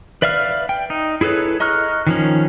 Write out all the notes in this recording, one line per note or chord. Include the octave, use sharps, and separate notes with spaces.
B4 D5 E5 F5 F6
G5
D#4
E4 G#4 A4 B4 C#5
D#5 A#5 C#6 F6 F#6
D#3 F3 C#4